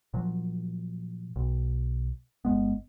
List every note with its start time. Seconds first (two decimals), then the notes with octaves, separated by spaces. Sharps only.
0.14 A#2 F3 F#3
1.36 B1
2.45 G1 G#3 B3